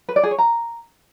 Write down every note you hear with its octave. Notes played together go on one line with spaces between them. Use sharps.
B4
D5
G#4
C#5
A#5